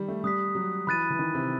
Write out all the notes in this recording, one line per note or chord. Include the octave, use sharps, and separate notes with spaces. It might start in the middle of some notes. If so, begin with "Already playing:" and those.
Already playing: D#3 G3
A3
G3 D#6 F#6 B6
F#3
E3 B5 F#6 A6 D#7
E3
D#3
C3